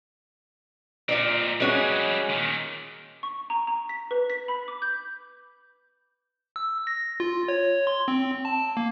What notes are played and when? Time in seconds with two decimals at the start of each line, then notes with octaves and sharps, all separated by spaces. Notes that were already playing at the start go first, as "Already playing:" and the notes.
1.09 A#2 C4 F4 D5 D#5
1.60 G3 G#3 C#4 F#4 G#4
2.30 A#2 D#3
3.23 C#6
3.50 A#5
3.67 A#5
3.89 B6
4.11 B4
4.30 B6
4.48 B5
4.68 D6
4.82 G6
6.56 E6
6.87 A#6
7.20 F4
7.48 C#5
7.87 C6
8.08 C4
8.45 A5
8.77 A#3